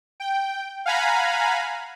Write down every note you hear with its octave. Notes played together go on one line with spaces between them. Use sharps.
G5
F5 F#5 G#5 A#5 B5